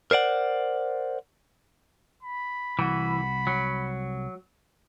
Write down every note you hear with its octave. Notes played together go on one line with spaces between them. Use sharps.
A#4 C5 D5 F#5
B5
C2 E3 F#4
F#3